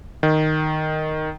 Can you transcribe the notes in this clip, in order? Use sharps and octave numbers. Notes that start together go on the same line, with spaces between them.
D#3